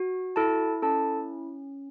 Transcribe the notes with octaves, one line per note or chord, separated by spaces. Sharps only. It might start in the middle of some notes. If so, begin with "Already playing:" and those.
Already playing: F#4
E4 A4 A5
C#4 A4 A5